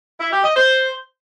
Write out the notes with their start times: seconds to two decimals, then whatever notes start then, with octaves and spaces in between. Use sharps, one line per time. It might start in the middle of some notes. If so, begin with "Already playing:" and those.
0.20 E4
0.32 G4
0.44 D#5
0.55 C5